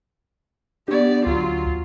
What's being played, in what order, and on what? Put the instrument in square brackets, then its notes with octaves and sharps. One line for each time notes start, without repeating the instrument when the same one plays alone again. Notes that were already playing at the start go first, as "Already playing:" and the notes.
[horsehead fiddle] B3 D5 [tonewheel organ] D4 G4
[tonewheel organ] D2 [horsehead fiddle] F#3 F4